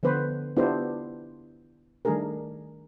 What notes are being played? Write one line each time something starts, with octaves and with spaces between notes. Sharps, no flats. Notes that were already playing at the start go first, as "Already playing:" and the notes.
D3 F3 B3 B4 C5
B3 D4 E4 F4 G4 C5
D#3 G3 A3 D4 G#4 A#4